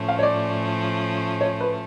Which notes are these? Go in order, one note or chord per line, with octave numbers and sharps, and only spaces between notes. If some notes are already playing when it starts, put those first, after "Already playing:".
Already playing: A2 F3 A3 C#4
F5
C#5
D5
C#5
B4